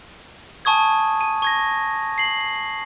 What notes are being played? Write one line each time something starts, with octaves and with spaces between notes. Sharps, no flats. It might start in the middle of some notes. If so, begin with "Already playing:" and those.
G#5 A5 C#6 D#6 G#6
D#7
C#6 G#6 A#6
C7 F#7